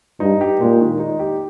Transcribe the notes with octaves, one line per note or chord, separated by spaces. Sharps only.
G2 D#4
G4
A#2 G#3
D#3
D#4
G4